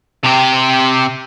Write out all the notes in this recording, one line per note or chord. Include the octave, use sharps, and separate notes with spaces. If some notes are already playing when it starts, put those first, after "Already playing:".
C3 G4